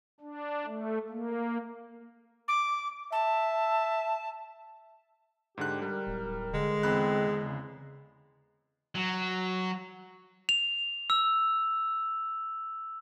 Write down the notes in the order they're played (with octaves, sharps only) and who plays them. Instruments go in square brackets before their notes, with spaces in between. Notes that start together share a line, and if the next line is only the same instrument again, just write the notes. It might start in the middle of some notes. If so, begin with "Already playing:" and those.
[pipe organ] D4
A3
A#3
[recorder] D6
[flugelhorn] E5 [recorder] A5
[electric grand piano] G#2 D3 F#6 [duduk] G4
[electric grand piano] G3 [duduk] A#4
[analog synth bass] D1
[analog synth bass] D3 [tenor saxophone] G#3
[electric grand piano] E2 B5 F#6 [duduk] C4
[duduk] C#3
[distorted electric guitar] F#3
[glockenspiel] F7
E6